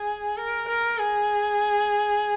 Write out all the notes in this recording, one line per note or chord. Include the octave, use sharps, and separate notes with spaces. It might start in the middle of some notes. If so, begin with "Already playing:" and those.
Already playing: G#4
A#4
A#4
G#4